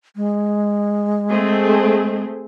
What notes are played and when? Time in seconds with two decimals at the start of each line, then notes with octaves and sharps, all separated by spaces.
0.16 G#3
1.29 A3 C4 G#4